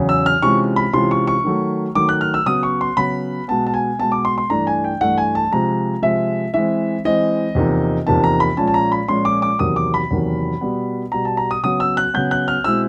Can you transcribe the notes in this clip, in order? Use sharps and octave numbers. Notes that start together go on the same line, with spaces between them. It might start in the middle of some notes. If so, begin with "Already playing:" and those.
Already playing: E2 C#3 F#3
E6
F6
C3 E3 G#3 C#4 F4 C#6
B5
C3 E3 G#3 C#4 F4 C6
C#6
C#6
D#3 F#3 A3
D#3 F#3 A3 D6
F#6
F6
E6
C#3 F#3 B3 D#6
C#6
C6
C#3 F#3 B3 B5
B2 G#3 B3 A5
A5
G#5
B2 G#3 B3 A5
D6
C6
C6
G2 E3 A3 D4 A#5
G#5
G5
G2 E3 A3 D4 F#5
G#5
A5
C3 F3 G#3 A#5
C3 F3 G#3 E5
E3 G#3 C4 E5
E3 G#3 C4 D#5
E2 C3 F3 A#3 D#4
E2 C3 F3 A#3 D#4 A5
A#5
B5
A#2 F3 G#3 C#4 A5
A5
A#5
B5
A#2 F3 G#3 C#4 C6
D6
D6
E2 C3 D#3 F#3 A#3 D#6
D6
B5
E2 C3 D#3 F#3 A#3
B2 G3 B3
B2 G3 B3 A#5
A5
A#5
D#6
C#3 F#3 B3 D#6
E6
F#6
C#3 F#3 B3 G6
F#6
F6
B2 G#3 C4 E4 E6